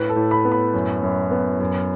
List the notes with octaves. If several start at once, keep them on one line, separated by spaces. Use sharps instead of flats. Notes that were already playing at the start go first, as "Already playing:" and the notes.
Already playing: A2 B4
A4
A2
B5
B3
B5
F#2
F#2
B3
F#2